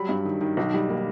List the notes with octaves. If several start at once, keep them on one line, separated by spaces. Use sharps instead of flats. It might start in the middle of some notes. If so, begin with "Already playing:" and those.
Already playing: F#3 G3 B5
G2
D#3
D#3
B1
G3
A#3